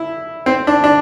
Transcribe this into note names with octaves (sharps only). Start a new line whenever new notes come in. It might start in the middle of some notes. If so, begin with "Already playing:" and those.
Already playing: E4
C4
D4
D4